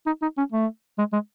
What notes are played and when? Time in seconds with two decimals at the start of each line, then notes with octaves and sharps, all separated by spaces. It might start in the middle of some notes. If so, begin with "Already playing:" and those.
0.06 D#4
0.22 D#4
0.38 C#4
0.52 A3
0.98 G#3
1.13 G#3